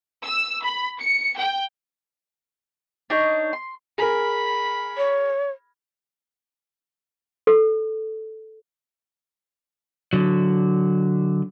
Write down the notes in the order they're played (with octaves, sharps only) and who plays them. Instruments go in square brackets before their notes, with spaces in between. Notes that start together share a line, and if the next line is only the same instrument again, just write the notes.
[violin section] E6
B5
C#7
G5
[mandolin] D4 D#4 C#5
C6
[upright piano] G#4 A#4 [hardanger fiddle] B5
[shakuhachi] C#5
[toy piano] A4
[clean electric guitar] D3 F#3